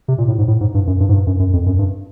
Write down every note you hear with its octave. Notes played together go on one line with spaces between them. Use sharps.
C3
A#2
A2
G#2
A2
G#2
G2
F#2
G2
G#2
G2
F#2
F#2
F2
F#2
G2